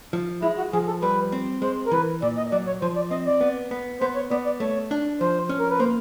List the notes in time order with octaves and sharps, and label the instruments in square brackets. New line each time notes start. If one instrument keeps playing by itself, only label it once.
[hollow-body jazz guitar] F3
[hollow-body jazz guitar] G#3 [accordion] E4
[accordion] F#4
[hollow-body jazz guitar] F3 [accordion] G#4
[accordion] A4
[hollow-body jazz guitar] G3 [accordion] B4
[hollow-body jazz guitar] C4
[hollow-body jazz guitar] G#3 [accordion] C5
[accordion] A#4
[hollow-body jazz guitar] E3 [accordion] B4
[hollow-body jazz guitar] A#2 [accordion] D5
[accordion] D#5
[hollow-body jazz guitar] F#3 [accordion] D5
[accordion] C#5
[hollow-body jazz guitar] F3 [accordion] C5
[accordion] D5
[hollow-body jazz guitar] C4 [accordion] D#5
[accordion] D5
[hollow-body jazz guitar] B3
B3
[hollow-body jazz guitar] B3 [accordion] C5
[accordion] C#5
[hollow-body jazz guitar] B3 [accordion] D5
[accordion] D5
[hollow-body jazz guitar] A3 [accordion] C#5
[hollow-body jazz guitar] D4
[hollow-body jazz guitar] F3 [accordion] C5
[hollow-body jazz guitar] C#4
[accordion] A#4
B4
[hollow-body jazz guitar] A#3 [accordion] C5